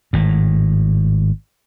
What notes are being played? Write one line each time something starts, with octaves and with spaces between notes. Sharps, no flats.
G#1 A2